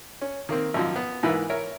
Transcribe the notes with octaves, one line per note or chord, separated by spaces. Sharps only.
C#4
D#3 A#3 C4
G#1 F#2 F3
B3
G#2 E3 A#3 B4 E5
A#4 C#5 E5